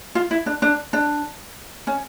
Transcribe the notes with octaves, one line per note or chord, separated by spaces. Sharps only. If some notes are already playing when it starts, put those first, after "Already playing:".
F4
E4
D4
D4
D4
C#4